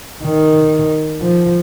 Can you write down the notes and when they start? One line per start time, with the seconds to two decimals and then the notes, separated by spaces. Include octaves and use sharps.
0.24 D#3
1.21 F3